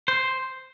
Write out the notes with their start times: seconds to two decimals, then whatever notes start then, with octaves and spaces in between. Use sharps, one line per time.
0.08 C5